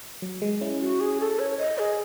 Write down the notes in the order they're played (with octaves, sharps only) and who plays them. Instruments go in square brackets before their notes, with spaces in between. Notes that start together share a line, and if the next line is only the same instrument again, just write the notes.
[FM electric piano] F#3
G#3
C#4 E4
[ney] F#4
G#4
A4
C#5
D#5
G#4